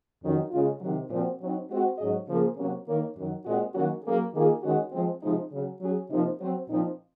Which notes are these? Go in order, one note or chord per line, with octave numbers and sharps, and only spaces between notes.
F2 D#3 F#3 C#4 F#4
C#3 G#3 C#4 F4
C3 D#3 F#3
A#2 F3 C4 F#4
F#3 C4 D#4
G#3 C4 F#4
G#2 F#3 C#4 G#4 D#5
C#3 F3 A#3 C#4 G#4
C3 F#3 A#3 C#4
D#3 A#3 D#4 A#4 C#5
F#2 D#3 F#3
A#2 G#3 C4 F#4
D#3 F#3 A#3 C#4 F#4
F#3 A#3 C#4 G#4
D#3 A#3 F4 G#4
D#3 G#3 C#4 F#4
F3 G#3 C4
C3 F3 G#3 D#4
C#3 F#3 C#4
F#3 C#4 G#4
C3 F3 A#3 D#4
F#3 C4 F#4 C5
A#2 F3 C4 D#4